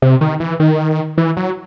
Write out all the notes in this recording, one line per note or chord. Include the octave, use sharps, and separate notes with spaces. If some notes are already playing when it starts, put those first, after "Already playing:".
C3
D#3
E3
D#3
E3
F#3